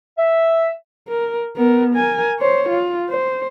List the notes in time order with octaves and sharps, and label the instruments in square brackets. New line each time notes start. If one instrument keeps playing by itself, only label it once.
[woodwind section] E5
[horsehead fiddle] A#4
B3 A#4
A#4 G#5
C5 C#5
F4
C5